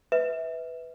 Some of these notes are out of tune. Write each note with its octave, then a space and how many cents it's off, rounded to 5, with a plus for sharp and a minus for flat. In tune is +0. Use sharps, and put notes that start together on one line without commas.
B4 +5 E5 -25